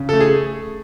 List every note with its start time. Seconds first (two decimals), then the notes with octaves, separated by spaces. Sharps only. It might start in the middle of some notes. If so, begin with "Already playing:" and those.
Already playing: C#3
0.09 A3 A4
0.20 G#4